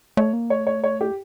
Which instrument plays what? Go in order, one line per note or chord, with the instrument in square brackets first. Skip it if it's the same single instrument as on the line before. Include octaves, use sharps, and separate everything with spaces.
[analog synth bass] A3 [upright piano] C#5
[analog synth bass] A#3
[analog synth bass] A3 [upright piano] C#5
[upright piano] C#5
C#5
G4